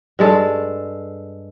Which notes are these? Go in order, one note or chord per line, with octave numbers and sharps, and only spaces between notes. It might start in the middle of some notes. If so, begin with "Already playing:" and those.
G2 G#3 A4